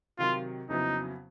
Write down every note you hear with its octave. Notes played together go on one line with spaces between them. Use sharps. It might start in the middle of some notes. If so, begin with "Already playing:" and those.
C3 D#3 F#3 F4
F2 C#3 F#3 B3 D#4 E4